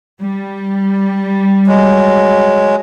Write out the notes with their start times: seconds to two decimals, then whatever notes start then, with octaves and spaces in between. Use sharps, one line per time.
0.21 G3
1.67 F#3 G#3